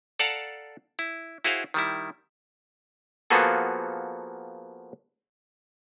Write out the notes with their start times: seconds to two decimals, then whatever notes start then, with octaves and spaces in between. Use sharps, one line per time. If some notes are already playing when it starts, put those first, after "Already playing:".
0.19 A4 D5 F5 F#5 A5 A#5
0.99 E4
1.45 E4 F#4 G#4 C5 F5
1.74 D#3 G3 E4
3.30 F3 A#3 B3 F#4 G#4 A4